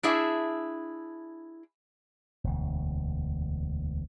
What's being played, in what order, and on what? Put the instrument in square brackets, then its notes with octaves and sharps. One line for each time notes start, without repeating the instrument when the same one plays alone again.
[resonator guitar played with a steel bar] D4 E4 G#4 E5
[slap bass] E1 D2